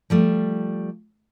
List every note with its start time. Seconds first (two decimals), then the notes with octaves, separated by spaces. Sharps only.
0.10 F3 G3 A3